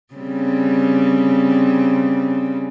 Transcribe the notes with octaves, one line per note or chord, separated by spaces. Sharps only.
C#3 G3 C4